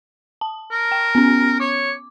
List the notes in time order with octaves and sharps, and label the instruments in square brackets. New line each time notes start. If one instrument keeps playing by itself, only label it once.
[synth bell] A5
[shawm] A#4
[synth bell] G5
B3 C#4
[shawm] C#5 [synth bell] D6